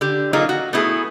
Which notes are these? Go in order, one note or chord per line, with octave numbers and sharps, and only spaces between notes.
D3 G4
F#3 A#3 D#4 F4 G#4
F#4
A3 B3 E4 G#4